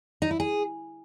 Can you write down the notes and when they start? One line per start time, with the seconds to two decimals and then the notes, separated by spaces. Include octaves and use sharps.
0.22 D#4
0.31 E4
0.40 G#4